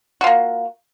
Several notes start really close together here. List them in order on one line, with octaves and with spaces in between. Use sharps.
F#4 F4 A#3